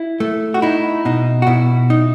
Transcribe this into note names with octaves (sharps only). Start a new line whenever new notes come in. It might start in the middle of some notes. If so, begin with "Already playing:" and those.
Already playing: E4
A3
F#4
D#4 E4
B2 D#4
F#4
B2 E4
D#4